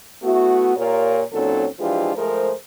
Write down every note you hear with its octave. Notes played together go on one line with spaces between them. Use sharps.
A3 B3 E4 F#4
A#2 F4 G4 A#4 C#5
A#2 F#3 C4 C#4 D#4 A4
E3 F3 G#3 D4 F4 G4
F3 G#3 A3 G#4 A#4 C5